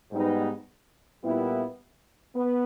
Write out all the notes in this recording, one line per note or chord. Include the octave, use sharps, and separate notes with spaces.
G#2 G3 B3 D#4
A#2 G3 B3 E4
B3